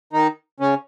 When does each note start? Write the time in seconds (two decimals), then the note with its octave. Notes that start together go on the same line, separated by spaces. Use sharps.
0.13 D#3 D#4
0.60 C#3 C#4